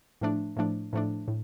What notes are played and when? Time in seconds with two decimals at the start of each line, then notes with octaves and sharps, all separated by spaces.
0.21 A2 F3 A3 D4
0.57 A2 F3 A3 D4
0.93 A2 F3 A3 D4
1.28 A2